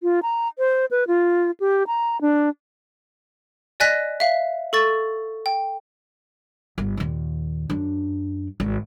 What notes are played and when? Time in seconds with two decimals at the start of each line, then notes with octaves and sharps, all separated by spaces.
0.03 F4
0.23 A#5
0.58 C5
0.91 B4
1.08 F4
1.60 G4
1.87 A#5
2.21 D4
3.80 D5 D#5 G#5 F#6 A#6 B6
4.20 E5 F5
4.73 A4 C#6 A6
5.46 G5
6.78 G1
6.97 D#2 A#2
7.70 F#2 D4
8.60 G#1